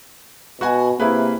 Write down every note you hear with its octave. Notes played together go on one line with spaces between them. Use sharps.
B2 F#4 F#5 G#5
C3 A#3 E4 G#4 B4